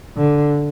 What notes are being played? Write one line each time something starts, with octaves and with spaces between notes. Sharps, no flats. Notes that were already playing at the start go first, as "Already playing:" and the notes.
D3